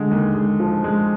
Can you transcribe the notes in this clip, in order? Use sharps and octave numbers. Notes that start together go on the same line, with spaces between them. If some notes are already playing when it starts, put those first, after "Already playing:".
Already playing: D3 G#3
D#2
G#3
F3
G#3